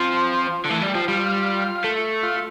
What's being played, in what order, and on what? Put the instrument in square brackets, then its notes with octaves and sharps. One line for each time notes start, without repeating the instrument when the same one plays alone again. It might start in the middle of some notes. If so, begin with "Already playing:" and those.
Already playing: [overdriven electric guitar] F3 [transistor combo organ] C4
[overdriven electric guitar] D3
[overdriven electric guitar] E3 [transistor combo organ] A3
[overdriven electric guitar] G3
[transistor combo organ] G4
[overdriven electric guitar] F3
[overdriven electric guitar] G3 [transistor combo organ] F4
[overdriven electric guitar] A3
[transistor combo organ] F4